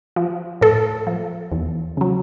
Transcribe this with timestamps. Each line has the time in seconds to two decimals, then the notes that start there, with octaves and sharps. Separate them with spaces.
0.16 F3
0.61 A2 A4
1.07 F3
1.52 E2
1.97 C#3 F#3